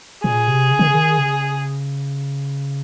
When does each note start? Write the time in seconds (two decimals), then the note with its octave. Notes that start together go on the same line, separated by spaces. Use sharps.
0.24 A#2 G#4
0.48 C3
0.71 C#3
0.79 D#3
0.87 C#3
0.94 D#3
1.18 C#3